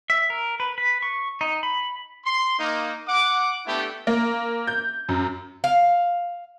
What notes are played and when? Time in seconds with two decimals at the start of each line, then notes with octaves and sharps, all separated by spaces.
0.10 E5
0.30 A#4
0.60 B4
0.78 B4
1.02 C#6
1.41 D#4
1.63 B5
2.25 C6
2.58 A#3 D#4
3.08 F#5 D6
3.66 A3 B3 D4 E4 G4 A4
4.07 A#3
4.67 G6
5.09 F#2
5.64 F5